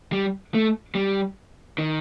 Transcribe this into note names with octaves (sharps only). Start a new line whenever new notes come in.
G3
A3
G3
D#3